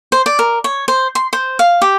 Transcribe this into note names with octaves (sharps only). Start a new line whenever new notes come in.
C5
D5
A#4
C#5
C5
C6
C5
F5
G4